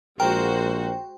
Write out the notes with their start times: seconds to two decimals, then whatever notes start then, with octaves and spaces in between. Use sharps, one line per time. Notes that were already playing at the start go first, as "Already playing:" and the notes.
0.20 A#1 G#3 F#4 A#4 C5 G5